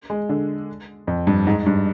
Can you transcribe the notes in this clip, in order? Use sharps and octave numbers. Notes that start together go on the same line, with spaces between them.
G#3
D3
F2
G2
G#2
G2